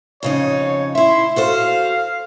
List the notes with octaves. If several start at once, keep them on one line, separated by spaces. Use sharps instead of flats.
F2 C#3 D#4 C#5
E4 E5 C6
F#4 A4 C5 F5